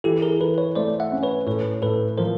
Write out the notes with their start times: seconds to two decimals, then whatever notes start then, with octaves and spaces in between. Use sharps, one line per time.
0.04 E3 G4 A4
0.22 G#4 A#4
0.40 E3 A4 B4
0.58 B4 C#5
0.75 A3 C5 D5
1.00 E5 F#5
1.12 C#4
1.23 B4 C#5
1.46 A2 B4 C#5
1.82 A2 A4 B4
2.18 F3 A#4 C5